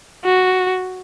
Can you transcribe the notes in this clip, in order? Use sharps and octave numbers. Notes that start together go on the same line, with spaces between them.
F#4